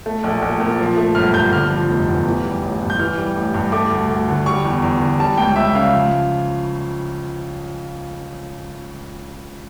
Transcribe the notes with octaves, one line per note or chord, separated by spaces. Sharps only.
A3
A#1
A#1
A#2
F3
A3
G1 F6
G2 G6
D3 F6
F3
F1
E2
E3
G3
A1
G2
G6
E3 F6
G3
A1
G2
A3 D6
D2
D2
D3
G3 C#6
E2
E2
D3
G3 A5
C#2 G5
C#2 E5
C#3 F5
F3